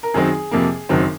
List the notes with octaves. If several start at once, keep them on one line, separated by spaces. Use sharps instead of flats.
A#4
F#2 D#3 F#3 C4 G#4
F2 C3 F3 A#3
F#1 F#2 D#3 F#3 C4